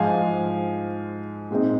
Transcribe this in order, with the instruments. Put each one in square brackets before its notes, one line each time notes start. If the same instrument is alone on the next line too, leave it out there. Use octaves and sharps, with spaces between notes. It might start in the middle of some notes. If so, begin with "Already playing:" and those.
Already playing: [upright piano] G#2 F3 G#3 F5 G#5
A#2 G#3 C4 D#4